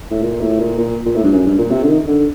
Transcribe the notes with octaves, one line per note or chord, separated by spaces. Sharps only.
A2
A#2
A2
A#2
A#2
A#2
A2
G2
F#2
G2
A#2
C3
D3
D#3
D3